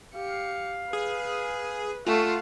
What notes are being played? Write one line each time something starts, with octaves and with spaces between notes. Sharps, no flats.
G4 F5 C#7
G#4 B4
A3 C#4 F4 F5 F#5